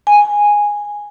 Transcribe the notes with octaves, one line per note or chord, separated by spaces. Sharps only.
G#5